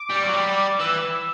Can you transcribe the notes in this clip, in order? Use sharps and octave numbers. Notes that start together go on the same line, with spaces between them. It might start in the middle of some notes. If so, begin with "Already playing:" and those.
Already playing: D6
G3
F#3
G3
E3 E6